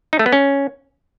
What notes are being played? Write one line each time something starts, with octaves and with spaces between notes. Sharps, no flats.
D#4
A3
B3
C#4